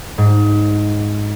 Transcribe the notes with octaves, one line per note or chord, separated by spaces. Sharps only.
G#2